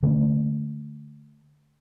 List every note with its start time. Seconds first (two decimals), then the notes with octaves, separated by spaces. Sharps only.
0.03 D3 A3 A#3 C#4